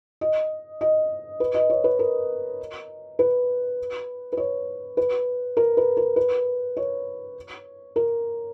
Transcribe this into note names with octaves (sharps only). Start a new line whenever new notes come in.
D#5
D#5
B4
D#5
C#5
B4
A#4
B4
B4
C#5
B4
A#4
B4
A#4
B4
C#5
A#4